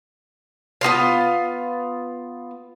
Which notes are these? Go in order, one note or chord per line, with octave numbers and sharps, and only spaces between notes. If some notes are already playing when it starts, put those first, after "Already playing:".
B3 D#4 F4 F5